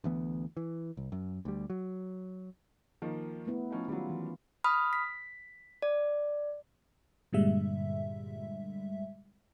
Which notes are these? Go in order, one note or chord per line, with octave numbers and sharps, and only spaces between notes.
D2 E3 B3
E3
C2
F#2
D2 G3
F#3
D#3 F3 A#3
A3 B3 E4
F3 C#4 D#4
D#3 F#3 G3 C#4 F4
E3
B5 D#6 F6
B6
D5
G2 A#2 D3 G3 G#3 E5